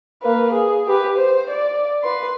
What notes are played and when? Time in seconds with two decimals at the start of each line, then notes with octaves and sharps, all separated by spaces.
0.22 A#3 B4
0.52 G#4
0.87 G4 B4
1.17 C5
1.50 D5
2.02 B4 C6